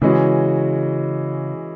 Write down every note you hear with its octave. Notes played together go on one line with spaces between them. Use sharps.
C#3 E3 G#3 C#4 F#4